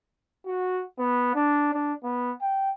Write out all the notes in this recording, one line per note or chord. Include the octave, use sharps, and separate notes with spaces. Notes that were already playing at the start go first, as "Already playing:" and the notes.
F#4
B3
D4
D4
B3
G5